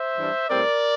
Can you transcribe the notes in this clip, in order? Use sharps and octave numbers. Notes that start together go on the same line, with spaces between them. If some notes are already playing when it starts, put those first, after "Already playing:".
Already playing: C5 E5
G2 E3 G3 D4
A2 G3 C4 A#4 D5